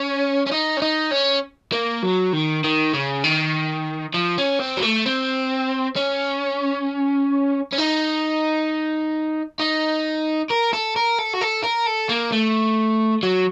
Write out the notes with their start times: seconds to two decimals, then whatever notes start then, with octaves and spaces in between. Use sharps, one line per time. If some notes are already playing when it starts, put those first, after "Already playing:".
Already playing: C#4
0.46 C#4
0.51 D#4
0.77 C#4
0.82 D#4
1.12 C#4
1.73 A#3
2.03 F#3
2.33 D#3
2.64 D#3
2.93 C#3
3.24 D#3
4.15 F3
4.38 C#4
4.60 C4
4.77 F#3
4.82 A3
5.06 C4
5.97 C#4
7.73 C#4
7.78 D#4
9.60 D#4
10.50 A#4
10.73 A4
10.96 A#4
11.19 A4
11.33 F#4
11.41 A4
11.63 A#4
11.86 A4
12.09 A#3
12.32 A3
13.23 F#3